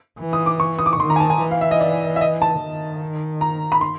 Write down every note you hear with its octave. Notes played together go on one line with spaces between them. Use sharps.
E3
D#6
D6
C#6
D#6
D6
C#6
D#3 C6
A#5
G#5
A5
G#5
E3
F5
E5
D#5
D5
E5
D#5
A5
D#3
A#5
B5
C6